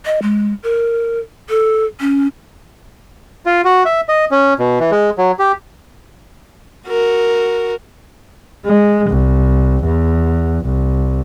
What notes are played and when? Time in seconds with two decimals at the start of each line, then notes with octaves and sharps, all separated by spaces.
0.06 D#5
0.22 G#3
0.63 A#4
1.49 A4
2.00 C#4
3.46 F4
3.65 F#4
3.85 E5
4.09 D#5
4.31 C#4
4.59 B2
4.80 E3
4.91 G#3
5.18 F#3
5.39 G4
6.87 F#4 A#4
8.65 G#3
9.09 C2
9.84 E2
10.64 C2